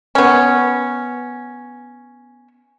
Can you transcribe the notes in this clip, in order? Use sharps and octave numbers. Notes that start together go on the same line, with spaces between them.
B3 C#4